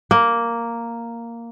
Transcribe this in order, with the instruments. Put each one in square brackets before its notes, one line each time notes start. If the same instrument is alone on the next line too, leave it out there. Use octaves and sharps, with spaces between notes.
[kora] A#3